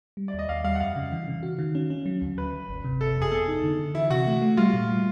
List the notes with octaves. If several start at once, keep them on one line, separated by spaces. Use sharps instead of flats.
G3
D5
D#2 D#5
D#2 F5
G3 F5
F#5
F2 F5
C#3
E3
C#3
F#4
D#3
C#4
C#4
F#3
D2
D2 B4
D2
G1
C3
G1 A4
F2
G#4
B3 A4
D#4
D3
D3
E3 E4
C3 F#4
A3
A3
G3 F4
A#2
G3